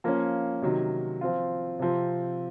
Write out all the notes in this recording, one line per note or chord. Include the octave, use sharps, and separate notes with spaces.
F3 A#3 C#4
C3 D#3 F#3
F3 C4 F4
C3 F3 C4